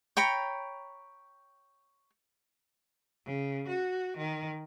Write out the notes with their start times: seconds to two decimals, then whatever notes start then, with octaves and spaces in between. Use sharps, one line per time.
0.17 C#5 G5 A#5 B5
3.26 C#3
3.68 F#4
4.18 D#3